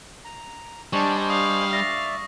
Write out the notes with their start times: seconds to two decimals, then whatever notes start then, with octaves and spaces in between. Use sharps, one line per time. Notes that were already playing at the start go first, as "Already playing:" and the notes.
0.25 A#5
0.93 G3 D4 C5 D#5 G#5 C#6
1.30 F5 D#6
1.73 D5 E5 A#6